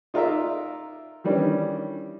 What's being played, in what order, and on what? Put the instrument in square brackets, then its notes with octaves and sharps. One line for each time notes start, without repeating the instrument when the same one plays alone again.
[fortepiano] D#4 F4 A#4 D5 E5
D#3 E3 G3 C#4 D4 D5